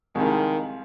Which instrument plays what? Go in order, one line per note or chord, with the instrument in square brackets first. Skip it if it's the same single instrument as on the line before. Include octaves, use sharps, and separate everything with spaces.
[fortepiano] C2 C3 F3 G#3 [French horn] D#3